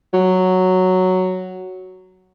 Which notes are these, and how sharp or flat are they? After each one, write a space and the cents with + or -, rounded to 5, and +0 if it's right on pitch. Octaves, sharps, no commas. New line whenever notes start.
F#3 +0